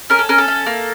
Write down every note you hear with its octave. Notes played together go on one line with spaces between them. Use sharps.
C#4 A#4
A4
C#4 A#4
A4
C#4
A#3